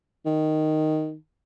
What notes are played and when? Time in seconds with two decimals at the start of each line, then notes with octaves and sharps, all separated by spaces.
0.26 D#3